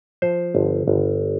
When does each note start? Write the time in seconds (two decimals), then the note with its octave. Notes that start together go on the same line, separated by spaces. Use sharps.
0.22 F3 C5
0.55 G1
0.88 G1